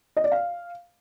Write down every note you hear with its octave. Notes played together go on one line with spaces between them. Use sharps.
D#5
D5
F5